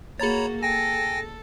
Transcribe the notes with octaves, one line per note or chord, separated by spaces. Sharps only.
A#3 F#4 G#4 C#5 A#5 B5 A6
A4 G5 G#5 A#6